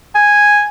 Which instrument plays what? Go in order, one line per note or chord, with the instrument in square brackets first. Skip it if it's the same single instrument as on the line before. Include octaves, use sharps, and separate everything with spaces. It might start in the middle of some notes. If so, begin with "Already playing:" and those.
[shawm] G#5